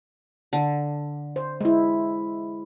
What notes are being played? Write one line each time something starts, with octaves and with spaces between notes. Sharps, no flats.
D3
C5
G#3 E4